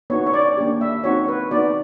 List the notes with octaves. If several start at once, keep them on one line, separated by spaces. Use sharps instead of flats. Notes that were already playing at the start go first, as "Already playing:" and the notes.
B3 D#4 F#4 C#5
C#5
D5
A#3 D4 G4
E5
C4 D#4 F#4 C#5
B4
B3 D#4 F#4 D5